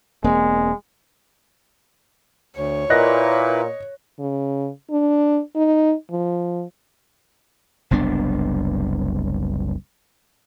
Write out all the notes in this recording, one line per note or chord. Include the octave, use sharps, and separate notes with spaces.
E1 G#3 A#3 C4
D2 C#5
A#2 E4 B4 D#5 F#6 A#6
C#3
D4
D#4
F3
F#1 C2 B3 D4